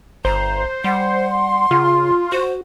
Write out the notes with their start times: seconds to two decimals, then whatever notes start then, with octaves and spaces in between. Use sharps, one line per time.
0.25 G1 C5 A#5
0.84 G3 F#5 C6
1.71 C#3 F4
2.32 F#4 C5